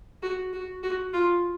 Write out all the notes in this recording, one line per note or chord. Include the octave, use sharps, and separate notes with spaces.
F#4
F#4
F#4
F4